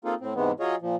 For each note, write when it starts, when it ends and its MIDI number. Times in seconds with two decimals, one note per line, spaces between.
0.05 0.14 58
0.05 0.14 60
0.05 0.14 63
0.05 0.14 65
0.05 0.14 68
0.05 0.14 69
0.21 0.34 45
0.21 0.34 60
0.35 0.51 44
0.35 0.51 48
0.35 0.51 52
0.35 0.51 56
0.35 0.51 59
0.60 0.75 54
0.60 0.75 65
0.60 0.75 68
0.60 0.75 73
0.60 0.75 75
0.82 0.96 46
0.82 0.96 53